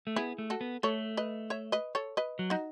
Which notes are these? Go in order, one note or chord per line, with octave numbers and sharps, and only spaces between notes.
A3
B3 E4 G#4
A3
F#4 A4
B3
A3 A4 C#5
B4 D#5
C#5 E5
B4 D#5
A4 C#5
B4 D#5
F#3
D#4 F#4